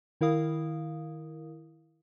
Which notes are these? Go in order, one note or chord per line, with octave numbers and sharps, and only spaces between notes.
D#3 E4 A#4 F5 D#6